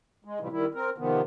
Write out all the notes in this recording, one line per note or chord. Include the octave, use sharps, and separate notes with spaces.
G#3
A2 C3 E3 F3 G3
D#3 G3 E4
C4 A#4
C3 D#3 F3 B3